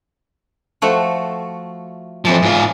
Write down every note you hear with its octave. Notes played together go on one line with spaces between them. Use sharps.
F3 A3 F#4
A2 E3 F3 C4 A5
G#2 F4